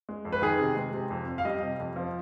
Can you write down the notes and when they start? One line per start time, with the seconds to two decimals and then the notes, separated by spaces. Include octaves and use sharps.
0.09 G#3
0.25 F2
0.32 B4
0.42 D#3 G#4
0.59 C3
0.76 G#3
0.93 C3
1.10 F2
1.28 F2
1.38 F5
1.45 G3 D#5
1.62 C3
1.80 F2
1.96 F3